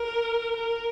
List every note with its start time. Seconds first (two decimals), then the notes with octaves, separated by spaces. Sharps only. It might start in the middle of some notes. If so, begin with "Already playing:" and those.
Already playing: A#4
0.56 A#4